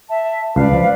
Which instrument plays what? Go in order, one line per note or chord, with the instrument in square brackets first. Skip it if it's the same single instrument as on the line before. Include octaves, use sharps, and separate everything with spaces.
[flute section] E5 A5
[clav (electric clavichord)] C#2 [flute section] B4 D5 F5
[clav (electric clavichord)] F3